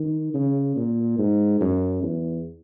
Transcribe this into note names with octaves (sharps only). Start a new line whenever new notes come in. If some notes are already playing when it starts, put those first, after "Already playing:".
Already playing: D#3
C#3
A#2
G#2
F#2
E2